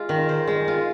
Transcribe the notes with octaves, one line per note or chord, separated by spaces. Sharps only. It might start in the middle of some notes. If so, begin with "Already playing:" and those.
Already playing: G#3 F4
D#3
C5
G#3
F4